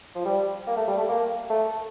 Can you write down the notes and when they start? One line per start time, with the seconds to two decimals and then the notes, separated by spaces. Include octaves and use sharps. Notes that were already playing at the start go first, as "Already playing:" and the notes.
0.15 F3
0.25 G3
0.67 A#3
0.77 A3
0.88 G3
0.97 A3
1.09 A#3
1.50 A3